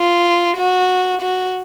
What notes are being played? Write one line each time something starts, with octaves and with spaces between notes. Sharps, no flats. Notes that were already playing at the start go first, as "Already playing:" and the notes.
Already playing: F4
F#4
F#4